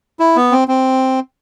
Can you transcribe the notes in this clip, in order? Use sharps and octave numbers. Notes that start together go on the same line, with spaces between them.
E4
B3
C4
C4